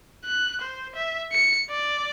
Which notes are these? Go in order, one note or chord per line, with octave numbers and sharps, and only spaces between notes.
F#6
C5
E5
C#7
D5